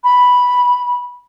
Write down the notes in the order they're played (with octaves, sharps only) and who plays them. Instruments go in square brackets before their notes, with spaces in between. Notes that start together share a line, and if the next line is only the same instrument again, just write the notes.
[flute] B5